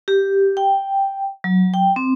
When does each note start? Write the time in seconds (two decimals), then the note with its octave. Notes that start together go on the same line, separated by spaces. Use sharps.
0.08 G4
0.57 G5
1.44 F#3
1.74 G5
1.96 C4